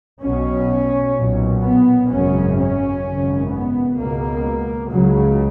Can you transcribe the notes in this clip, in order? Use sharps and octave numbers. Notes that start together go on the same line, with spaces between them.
B1 B2 C#4
B1 A#2
B3
G#1 F#2 C#3 C#4
C#4
G#1 F#2 C#3
B3
C#2 B2 A#3
C#2 C#3 F#3